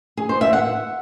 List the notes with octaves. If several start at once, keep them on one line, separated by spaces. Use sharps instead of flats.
G#4
C5
E5
F#5